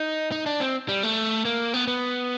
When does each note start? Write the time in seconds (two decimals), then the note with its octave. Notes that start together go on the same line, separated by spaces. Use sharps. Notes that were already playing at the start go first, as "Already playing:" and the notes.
Already playing: D#4
0.32 D#4
0.46 D4
0.60 C4
0.89 G3
1.03 A3
1.45 A#3
1.74 B3
1.87 B3